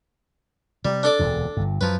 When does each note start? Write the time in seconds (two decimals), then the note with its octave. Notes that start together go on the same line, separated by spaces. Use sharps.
0.85 C3 G3
1.03 D4 A4 D5
1.19 E1 D2 A#2
1.57 G1 G2
1.81 F#2 F3 F#3 B4